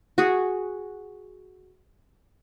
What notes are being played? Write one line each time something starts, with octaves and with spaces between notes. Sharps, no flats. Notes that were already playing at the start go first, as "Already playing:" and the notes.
F#4 G#4